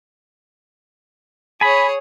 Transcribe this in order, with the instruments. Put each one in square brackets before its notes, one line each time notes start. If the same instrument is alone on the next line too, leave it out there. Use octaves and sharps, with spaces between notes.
[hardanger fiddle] G#4 C#5 [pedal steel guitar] G#5 B5